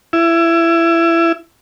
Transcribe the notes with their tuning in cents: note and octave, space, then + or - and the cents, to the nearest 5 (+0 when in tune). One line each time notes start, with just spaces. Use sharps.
E4 +20